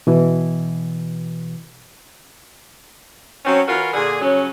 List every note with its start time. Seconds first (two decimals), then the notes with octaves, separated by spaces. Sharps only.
0.07 B2 E3
3.45 F#3 C4 C#4
3.68 E3 F4 F#4 A#4
3.94 A#2 D3 G#4
4.21 G2 C#3 F#3 C#4